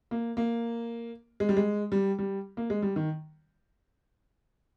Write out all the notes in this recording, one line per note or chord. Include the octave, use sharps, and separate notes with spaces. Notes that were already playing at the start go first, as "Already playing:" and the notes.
A#3
A#3
G#3
G3
G#3
G3
G3
A#3
G#3
G3
D#3